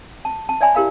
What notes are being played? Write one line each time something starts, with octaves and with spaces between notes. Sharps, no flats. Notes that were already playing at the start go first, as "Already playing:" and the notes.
A5
A5
C#5 D5 E5 G#5 B5 C6
E4 G4 A#4 F5 B5